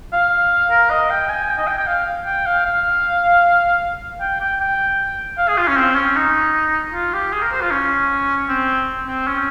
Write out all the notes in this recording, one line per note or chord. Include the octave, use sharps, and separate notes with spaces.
F5
A#4
D#5
G5
G#5
G5
D#5
G5
G5
F5
G5
F5
F5
G5
G5
G5
F5
G#4
F4
C#4
C4
C#4
D#4
F4
G4
G#4
A#4
C5
F4
C#4
C4
C4
C#4